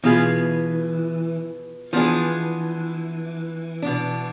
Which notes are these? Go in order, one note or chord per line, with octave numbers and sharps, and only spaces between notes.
B2 E3 B3 F4 G#4
E3 F3 B3 D4 G#4
B2 B3 D4